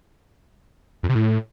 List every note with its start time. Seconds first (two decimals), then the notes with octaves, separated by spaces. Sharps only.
1.03 F2
1.09 C3
1.15 A2